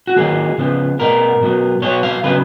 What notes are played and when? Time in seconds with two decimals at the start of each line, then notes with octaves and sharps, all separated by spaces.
0.07 F#4
0.16 D#3 F#3 A#3 G#4
0.58 C#3 F3 B3
0.99 B2 G#3 B3 A#4
1.41 B2 F#3 B3
1.82 B2 F#3 B3 C#5
2.03 F5
2.24 C#3 F#3 B3 B4